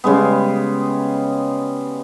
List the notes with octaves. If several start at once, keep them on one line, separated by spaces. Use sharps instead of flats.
C#3 G3 G#3 B3